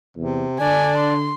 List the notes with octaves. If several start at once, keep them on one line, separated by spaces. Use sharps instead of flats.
E2 C3
D3 D4 D5 G#5
C6